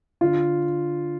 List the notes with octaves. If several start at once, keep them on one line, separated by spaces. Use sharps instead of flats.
D3 F4